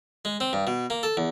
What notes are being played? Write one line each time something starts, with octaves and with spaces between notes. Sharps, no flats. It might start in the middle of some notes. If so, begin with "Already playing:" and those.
G#3
C4
G2
B2
A#3
A4
E2